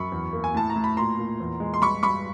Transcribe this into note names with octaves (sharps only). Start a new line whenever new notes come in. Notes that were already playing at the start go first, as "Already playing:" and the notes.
Already playing: F#2 B5 C#6
E2
A#3
G#5
A2 A5
A#5
A2
B5
A#2 A#5 C6
A#2
E2
G#3
C6
G2 B5 C#6
G2 B5 C#6